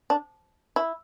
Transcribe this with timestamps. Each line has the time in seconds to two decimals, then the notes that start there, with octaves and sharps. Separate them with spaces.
0.10 D4
0.76 E4